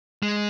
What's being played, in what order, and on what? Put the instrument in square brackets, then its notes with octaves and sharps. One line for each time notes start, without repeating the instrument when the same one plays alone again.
[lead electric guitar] G#3